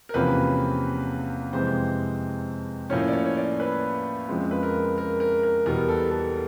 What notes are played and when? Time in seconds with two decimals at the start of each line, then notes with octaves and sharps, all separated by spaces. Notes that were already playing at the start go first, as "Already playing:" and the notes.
0.09 A#4
0.14 E2 C3 F3 A#3 C#4 B4
1.52 F2 C3 E3 G#3 C4 C5
2.90 A2 F3 A#3 C#4 C#5
3.08 D5
3.13 C#5
3.26 C#5
3.37 D5
3.60 B4
4.28 F2 C#3 F3 G#3 C4
4.51 B4
4.63 A#4
4.98 A#4
5.20 A#4
5.43 A#4
5.66 E2 B2 G3 B3 A#4
5.89 A4
6.12 A4